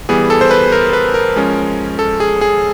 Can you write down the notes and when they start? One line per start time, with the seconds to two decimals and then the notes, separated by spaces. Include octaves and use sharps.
0.09 E3 G3 B3 G#4
0.30 A4
0.41 C5
0.51 B4
0.72 A#4
0.93 B4
1.14 A#4
1.36 F3 G#3 C#4
1.99 A4
2.20 G#4
2.41 G#4